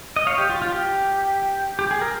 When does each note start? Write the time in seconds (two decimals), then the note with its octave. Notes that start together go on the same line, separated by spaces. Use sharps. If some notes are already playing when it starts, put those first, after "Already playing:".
0.16 D#5
0.27 C#5 F5
0.38 G4
0.49 F4
0.62 F4
0.72 G4
1.79 G4
1.91 G#4
2.01 A#4